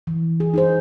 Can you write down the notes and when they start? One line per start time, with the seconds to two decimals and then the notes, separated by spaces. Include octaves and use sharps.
0.07 E3
0.40 G#4
0.54 D#4 G#4 C5